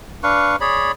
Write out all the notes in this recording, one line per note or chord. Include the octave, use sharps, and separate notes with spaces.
D4 B4 F5 C#6
G#4 C#5 D5 B5